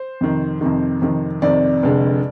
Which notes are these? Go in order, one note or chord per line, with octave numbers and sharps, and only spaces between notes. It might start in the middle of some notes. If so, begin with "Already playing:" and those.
Already playing: C5
F2 C3 D#3
F2 C3 D#3
F2 C3 D#3
F2 C3 D#3 D5
F1 F2 D3 G#3